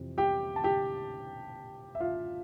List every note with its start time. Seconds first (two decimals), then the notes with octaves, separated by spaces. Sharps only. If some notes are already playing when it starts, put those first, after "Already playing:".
Already playing: F2 C3 E3
0.18 G4 G5
0.56 A5
0.64 G4 G5
1.95 E5
2.00 F4 F5